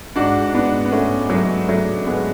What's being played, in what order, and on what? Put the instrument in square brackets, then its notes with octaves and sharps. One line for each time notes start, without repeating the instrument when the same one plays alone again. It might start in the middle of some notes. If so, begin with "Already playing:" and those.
[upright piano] G#2 D4 F#4
G#2
B3 D4
G#2
B3
G#2 A3 C#4
G#2
F#3 A3
G#2
G#2 F#3 A3
G#2
G#3 B3